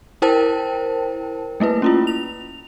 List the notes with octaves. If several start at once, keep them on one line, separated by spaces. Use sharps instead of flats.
E4 A#4 C5 G5 A5
A3 A#3 E4 B4
C#4 E4 F4
F7